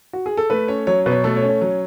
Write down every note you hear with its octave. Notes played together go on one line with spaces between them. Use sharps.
F#4
G#4
A4
A3 B4
C#4 C#5
F#3 C#5
B2 B4
C#5
A3 A4
C#5
C#4
C#5
F#3